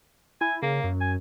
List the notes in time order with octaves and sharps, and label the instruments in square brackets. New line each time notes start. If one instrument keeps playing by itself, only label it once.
[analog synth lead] E4 [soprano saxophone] G#5
[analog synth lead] C#3 [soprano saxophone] A#3
[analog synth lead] F#2
[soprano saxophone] G#5